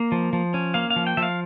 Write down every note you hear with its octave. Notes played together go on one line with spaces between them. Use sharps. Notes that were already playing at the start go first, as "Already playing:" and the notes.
Already playing: A#3
F3
F3
C#4
A#3 F5
F5
F3
G5
F3 E5
F5